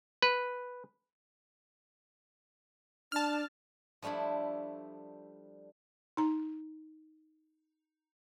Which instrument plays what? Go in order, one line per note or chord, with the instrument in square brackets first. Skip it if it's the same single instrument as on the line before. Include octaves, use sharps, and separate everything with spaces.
[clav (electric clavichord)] B4
[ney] D4 [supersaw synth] A5 F6
[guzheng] F3 G3 A3 D4 E4
[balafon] D#4 A#5